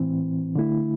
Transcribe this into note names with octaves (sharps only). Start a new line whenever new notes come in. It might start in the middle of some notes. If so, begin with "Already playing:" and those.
Already playing: A2 E3 C4
D3 A3 E4